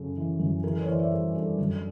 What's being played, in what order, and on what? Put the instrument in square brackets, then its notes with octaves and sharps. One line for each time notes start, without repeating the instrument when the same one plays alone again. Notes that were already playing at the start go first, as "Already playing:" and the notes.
Already playing: [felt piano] F#2 C#3 A4
E3
F#2
E3 G#4 A#4
A4 B4
C#5
E3 C5 D5
D5 E5
G2 G#4 A#4
G2 A4
F#2 A4